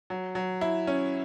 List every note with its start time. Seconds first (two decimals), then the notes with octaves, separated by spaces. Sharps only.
0.10 F#3
0.35 F#3
0.61 E4
0.87 C#4